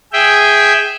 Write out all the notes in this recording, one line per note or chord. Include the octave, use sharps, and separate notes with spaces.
G#4 E5 G5